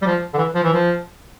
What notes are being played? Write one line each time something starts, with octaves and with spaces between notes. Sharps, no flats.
G3
F3
D3
E3
F3
E3
F3